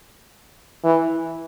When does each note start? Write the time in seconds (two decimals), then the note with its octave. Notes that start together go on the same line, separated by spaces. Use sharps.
0.84 E3